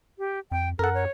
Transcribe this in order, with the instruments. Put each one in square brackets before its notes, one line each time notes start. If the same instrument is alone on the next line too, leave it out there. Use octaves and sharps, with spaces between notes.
[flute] G4
[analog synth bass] F2 [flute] G5
[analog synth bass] F#2 [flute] A4 [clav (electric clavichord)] A#4 F#5
[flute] C#5